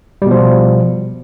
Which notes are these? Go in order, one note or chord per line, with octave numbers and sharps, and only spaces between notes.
B2 F3 G3